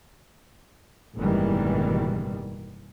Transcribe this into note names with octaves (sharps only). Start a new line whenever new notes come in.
F#1 G#2 B2 D#3 E3 G3